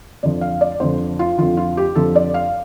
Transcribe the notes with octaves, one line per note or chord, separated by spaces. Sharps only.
F2 D3 F3 D5
F5
D5
F2 D3 F3 C5
F4
F2 D3 F3 F4
F4
G4
F2 D3 F3 A4
D5
F5